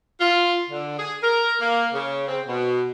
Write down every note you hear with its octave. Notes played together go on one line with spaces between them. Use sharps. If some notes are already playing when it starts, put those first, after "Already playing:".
F4
D3
G#4
A#4
A#3
C#3
C4
B2